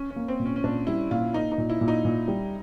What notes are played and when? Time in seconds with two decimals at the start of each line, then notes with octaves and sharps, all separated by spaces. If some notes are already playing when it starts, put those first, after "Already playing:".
Already playing: C#4
0.10 C#4
0.16 A#3
0.28 C4
0.40 A#2
0.46 C#4
0.56 C#4
0.64 A#2 D4
0.87 G3 E4
1.11 A#2 F4
1.34 A#3 D#4
1.52 D#4
1.58 A#2
1.70 E4
1.81 A#2
1.88 D#4
2.05 A#2
2.28 G3